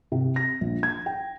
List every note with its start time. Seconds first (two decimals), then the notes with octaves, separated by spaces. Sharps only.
0.12 C3
0.36 A#6
0.61 A#1
0.83 G#6
1.06 G5